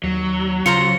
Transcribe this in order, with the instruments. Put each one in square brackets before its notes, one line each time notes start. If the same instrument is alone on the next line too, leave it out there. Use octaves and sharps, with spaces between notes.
[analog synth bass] D#2 [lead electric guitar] F#3
[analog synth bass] C#3 [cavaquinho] F4 C5 A#5 [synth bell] C#7